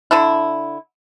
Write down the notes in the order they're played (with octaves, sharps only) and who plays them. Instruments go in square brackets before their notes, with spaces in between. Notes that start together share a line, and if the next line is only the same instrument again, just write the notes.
[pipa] D3 D4 E4